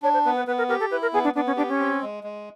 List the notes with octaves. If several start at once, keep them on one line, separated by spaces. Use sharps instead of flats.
D4 C#5
C5
B3 B4
B4
B3 B4
A#4
G4 A#4
A4
E4 B4
A#4
B3 G#4
D4
B3 D4
C#4
D4 G4
C#4
C4
G#3
G#3